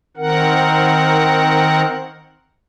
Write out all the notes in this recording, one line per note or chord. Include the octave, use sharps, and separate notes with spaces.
D#3 C4 A#4 F#5